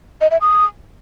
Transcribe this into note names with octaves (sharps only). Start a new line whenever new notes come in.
D#5
E5
D#6